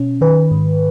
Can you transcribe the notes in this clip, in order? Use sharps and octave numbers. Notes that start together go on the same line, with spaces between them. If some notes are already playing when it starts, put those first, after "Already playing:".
Already playing: B2 C#4
D#3 B4
G#2